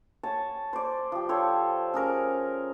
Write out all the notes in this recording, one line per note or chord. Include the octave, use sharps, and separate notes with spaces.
C#5 G#5 A5
C5 D5
F3 G4
A4 C5 C#5
C#4 G#4 A#4